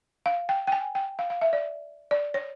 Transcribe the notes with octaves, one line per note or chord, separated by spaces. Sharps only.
F5
G5
G5
G#5
G5
F5
F5
E5
D5
D5
C#5